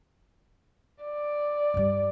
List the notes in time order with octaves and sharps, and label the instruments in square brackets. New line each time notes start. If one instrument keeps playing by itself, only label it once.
[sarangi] D5
[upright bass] G2 G3